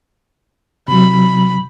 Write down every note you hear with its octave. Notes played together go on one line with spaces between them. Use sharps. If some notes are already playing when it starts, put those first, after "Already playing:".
C3 F#3 B5